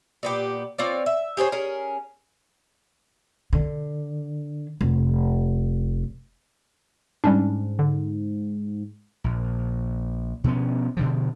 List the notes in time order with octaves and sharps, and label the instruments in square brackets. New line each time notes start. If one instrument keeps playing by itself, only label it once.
[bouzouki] A#2 B3 G4
C4 F4 C#5 D5
E5
G4 G#4 C5 C#5
C#4 G#4 A#4
[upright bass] D3
F1
[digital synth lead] G#2 [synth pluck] G3 C#4 D4
[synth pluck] D3
[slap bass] A#1
B2 F3 B3 C#4
B2 D3 F3